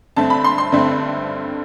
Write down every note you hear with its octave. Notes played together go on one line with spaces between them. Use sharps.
G2 D3 A3 C4 A5
B5
C6
C6
G2 D3 A3 C4